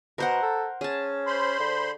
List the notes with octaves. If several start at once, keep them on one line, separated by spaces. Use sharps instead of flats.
B2 A#4 C5 F#5
A4
C#4 G#4 A5
C5 B5 C6
D3